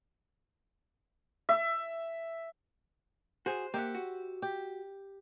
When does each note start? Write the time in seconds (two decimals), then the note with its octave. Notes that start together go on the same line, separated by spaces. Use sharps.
1.49 E5
3.46 F#4 G#4 C5
3.74 A#3 G4 E5 F#5
3.95 F#4
4.42 G4